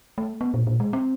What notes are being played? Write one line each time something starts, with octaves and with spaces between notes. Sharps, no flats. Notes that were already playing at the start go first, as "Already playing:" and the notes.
A3
B3
A#2
A#2
G#3
C4